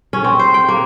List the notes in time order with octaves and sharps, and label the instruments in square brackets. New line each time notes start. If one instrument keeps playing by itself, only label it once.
[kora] C#4
C4
C5
G5
A#3